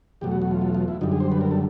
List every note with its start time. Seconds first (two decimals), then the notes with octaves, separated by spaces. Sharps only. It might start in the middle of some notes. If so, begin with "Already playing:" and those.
0.21 E2 B2 F#3 A3 G4
0.32 F#4
0.42 F#4
0.51 F4
0.61 F4
0.75 F4
0.88 E4
1.01 F#2 D3 G3 D#4
1.12 G#4
1.20 C5
1.32 B4
1.41 A#4
1.51 A4